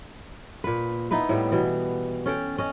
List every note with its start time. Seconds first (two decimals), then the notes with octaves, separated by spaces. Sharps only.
0.64 A#2 B4
1.11 B3 D#4 E4 B4
1.29 A2 G3 B3
1.51 B2 E3
2.26 C#4 A4 G5
2.58 C#4 D#5